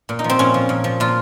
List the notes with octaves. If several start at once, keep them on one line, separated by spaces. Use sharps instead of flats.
A#2
D#4
F3
C4
A#2 C#4
F3
A#2
F3
A#2 F4